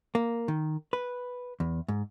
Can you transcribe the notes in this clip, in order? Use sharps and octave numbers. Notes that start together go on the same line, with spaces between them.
A#3
D#3
B4
E2
G#2